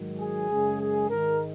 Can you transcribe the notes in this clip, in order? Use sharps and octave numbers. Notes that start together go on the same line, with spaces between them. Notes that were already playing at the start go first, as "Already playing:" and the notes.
Already playing: G#2 D#3 F#3
G#4
F#2 C#3 G#3
G#4
G#2 D#3 G#3 A#4